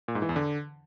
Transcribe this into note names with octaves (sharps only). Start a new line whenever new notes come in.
A#2
G#2
E3
E2
D3